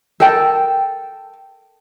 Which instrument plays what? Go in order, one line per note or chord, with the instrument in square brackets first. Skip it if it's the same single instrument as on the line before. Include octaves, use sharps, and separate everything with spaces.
[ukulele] A4 A#4 G5 A5